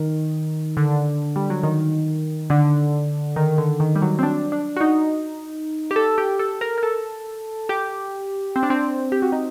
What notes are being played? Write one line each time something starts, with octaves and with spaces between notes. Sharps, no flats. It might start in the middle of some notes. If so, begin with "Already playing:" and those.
Already playing: D#3
D3
G3
F#3
D#3
D3
D#3
D3
D#3
G3
F#3
C4
D4
D4
F#4
D#4
G4
A4
G4
A4
A#4
A#4
A4
G4
C4
D4
C4
G4
F#4
D#4